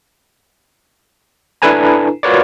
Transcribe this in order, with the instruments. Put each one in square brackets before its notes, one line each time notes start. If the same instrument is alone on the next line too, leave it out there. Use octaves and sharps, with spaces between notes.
[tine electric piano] D4 E4 A4 B4 G#5 A#5
F4 F#4 A#4 B4 C#5 D5